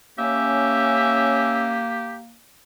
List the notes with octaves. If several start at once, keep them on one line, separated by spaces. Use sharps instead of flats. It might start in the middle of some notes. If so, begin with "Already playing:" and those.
A#3 C#4 G4 E5